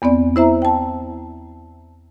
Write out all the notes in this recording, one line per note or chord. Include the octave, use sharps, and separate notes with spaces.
E2 B3 C4 D5
E4 C5 E5 A#5
G5 A5